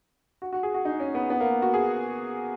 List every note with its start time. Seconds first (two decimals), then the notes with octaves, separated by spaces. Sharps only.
0.42 F#4
0.53 F#4
0.63 G#4
0.74 F#4
0.85 D#4
1.00 C#4
1.15 B3
1.30 B3
1.40 A#3
1.62 F#4
1.74 G#4